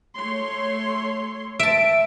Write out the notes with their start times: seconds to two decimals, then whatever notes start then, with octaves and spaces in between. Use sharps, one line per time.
0.17 A3 C#5 C6
1.59 E5 A5 D7